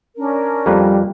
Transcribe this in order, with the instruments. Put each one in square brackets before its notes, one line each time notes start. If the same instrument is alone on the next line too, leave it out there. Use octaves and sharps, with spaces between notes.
[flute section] C#4 D4 A#4
[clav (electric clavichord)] F2 A#3 B4 [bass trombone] G3